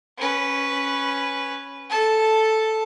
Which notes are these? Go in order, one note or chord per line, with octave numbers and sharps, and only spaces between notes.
C#4 B4
A4 A5